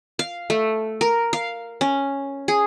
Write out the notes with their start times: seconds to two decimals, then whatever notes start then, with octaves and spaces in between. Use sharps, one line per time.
0.19 F5
0.50 A3
1.01 A#4
1.33 F5
1.81 C#4
2.48 G#4